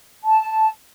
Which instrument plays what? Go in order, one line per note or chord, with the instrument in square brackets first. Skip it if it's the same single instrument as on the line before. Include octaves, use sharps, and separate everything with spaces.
[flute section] A5